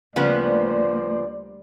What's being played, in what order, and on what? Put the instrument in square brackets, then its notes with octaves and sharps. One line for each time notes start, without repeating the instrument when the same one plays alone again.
[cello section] D2 A#3 C5 [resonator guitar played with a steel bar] C#3 F3 B3 [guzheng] G3 [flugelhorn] D5